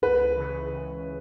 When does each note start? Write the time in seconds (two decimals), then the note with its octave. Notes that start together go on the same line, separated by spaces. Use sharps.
0.02 C#2 B4
0.36 C#3 E3
0.71 C#2